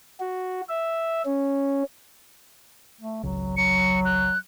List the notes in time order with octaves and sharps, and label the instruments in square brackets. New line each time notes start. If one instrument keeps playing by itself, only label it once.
[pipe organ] F#4
E5
C#4
[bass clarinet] A3
[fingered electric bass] G#1 C#2 [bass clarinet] F#3
[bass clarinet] F#3 [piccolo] C#7
[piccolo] F#6